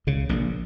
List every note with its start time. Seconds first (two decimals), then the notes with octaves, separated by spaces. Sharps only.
0.07 C#2 C#3
0.29 A#1 A#2